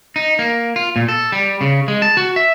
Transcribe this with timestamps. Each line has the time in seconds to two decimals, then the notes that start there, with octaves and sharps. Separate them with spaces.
0.16 D#4
0.39 A#3
0.76 F4
0.96 A#2
1.09 A4
1.32 G3
1.61 C#3
1.88 G#3
2.02 A5
2.17 F#4
2.36 E5